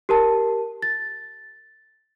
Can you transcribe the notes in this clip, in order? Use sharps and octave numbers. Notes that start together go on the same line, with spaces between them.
G4 A#4 A5
A6